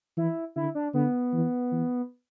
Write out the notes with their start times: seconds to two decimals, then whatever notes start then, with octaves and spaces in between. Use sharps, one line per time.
0.17 E3 E4
0.56 D3 E4
0.75 D4
0.94 D3 B3
1.33 E3
1.71 E3